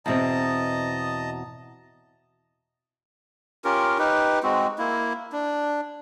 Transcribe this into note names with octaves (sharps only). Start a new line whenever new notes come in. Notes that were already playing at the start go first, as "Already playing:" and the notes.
E2 B2 C4 D#5 A5 A#5
C#4 F4 G4 A#4
D#4 G4 B4
G#3 C4 F#4
A#3 E4
D4